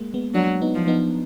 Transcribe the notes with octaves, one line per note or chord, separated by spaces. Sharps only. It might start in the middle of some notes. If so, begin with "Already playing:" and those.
Already playing: G#3 A#3
G#3 B3
F#3 A#3 D4
B3 D#4
F3
B3 D#4